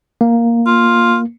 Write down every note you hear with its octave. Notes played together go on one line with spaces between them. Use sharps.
A#3
F4